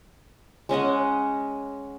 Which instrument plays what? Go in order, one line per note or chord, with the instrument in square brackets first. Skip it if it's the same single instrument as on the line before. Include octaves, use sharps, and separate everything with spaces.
[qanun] G#3 C#4 D#5 F#5